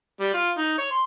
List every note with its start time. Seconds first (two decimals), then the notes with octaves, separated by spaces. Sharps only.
0.20 G3
0.34 F4
0.58 D#4
0.78 C#5
0.91 C6